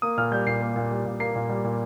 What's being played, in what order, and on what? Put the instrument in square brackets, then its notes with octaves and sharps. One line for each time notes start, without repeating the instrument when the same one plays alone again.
[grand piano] A#3 D#6
A#2 F6
G3 G6
A#2 C7
A#3
A#2
G3
A#2
A#3 C7
A#2
G3
A#2